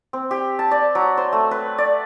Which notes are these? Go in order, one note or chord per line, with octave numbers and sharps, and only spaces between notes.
C4
G4
A5
D5
F#3
C5
A3
B4
D5